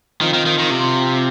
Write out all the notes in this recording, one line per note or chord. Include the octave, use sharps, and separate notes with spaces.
D#3 F3 C4 F4
D#3
D#3
D#3
C3